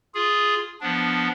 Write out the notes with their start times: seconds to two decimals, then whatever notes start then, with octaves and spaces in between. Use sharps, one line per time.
0.15 F4 G#4
0.81 F3 B3 D4